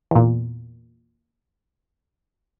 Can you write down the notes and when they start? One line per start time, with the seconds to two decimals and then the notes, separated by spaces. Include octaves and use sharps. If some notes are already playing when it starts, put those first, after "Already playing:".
0.11 E2 A#2